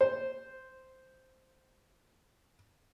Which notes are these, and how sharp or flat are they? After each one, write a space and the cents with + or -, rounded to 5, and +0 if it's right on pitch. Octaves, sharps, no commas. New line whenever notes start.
C5 -5